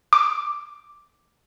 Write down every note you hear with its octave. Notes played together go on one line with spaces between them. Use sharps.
D6